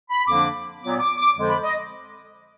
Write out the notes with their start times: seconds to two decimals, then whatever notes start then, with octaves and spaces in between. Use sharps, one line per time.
0.10 B5
0.27 F2 D3 F3 A#3 D4 D6
0.82 A#2 F#3 B3 D6
1.00 D6
1.17 D6
1.36 F2 D3 F3 G#3
1.49 B5
1.63 D#5